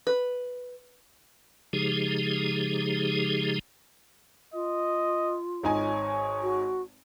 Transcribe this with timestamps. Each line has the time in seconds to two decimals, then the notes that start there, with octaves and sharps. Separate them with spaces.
0.07 B4
1.73 C#3 F3 G#3 D#4 G4 G#4
4.54 F4 D#5
5.63 G#1 D#4 C#5 G#5
6.43 F#4